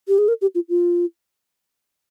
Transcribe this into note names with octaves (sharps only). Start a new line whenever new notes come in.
G4
G#4
A#4
G4
F4
F4